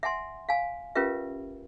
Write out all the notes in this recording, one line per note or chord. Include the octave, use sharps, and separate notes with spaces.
E5 F#5 G#5 C6
F5 G#5
C#4 F4 G4 A#4 B4 E5